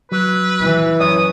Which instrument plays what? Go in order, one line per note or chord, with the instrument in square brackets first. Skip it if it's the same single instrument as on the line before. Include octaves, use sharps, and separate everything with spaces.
[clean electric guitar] F#3 [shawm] B4
[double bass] E3
[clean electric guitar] F#2 C#5 [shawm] D#6